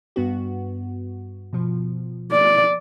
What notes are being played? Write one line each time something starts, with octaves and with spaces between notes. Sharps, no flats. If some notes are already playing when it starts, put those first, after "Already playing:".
G2 B3 F#4
B2 F3
D5